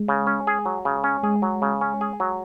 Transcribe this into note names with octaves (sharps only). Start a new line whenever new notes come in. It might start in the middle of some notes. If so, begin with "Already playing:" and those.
Already playing: G#3
C#3
C#4
G#4
F#3
C#3
C#4
G#3 G#4
F#3
C#3
C#4
G#4
F#3